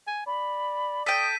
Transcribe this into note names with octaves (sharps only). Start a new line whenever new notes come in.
G#5
D5 B5
A4 G5 D#6 B6 D#7